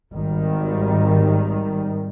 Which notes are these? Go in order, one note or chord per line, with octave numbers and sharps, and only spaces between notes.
G#1 D#3 G3